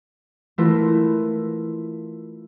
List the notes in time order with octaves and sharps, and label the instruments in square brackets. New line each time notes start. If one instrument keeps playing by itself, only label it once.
[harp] E3 A3 E4 F4 A#4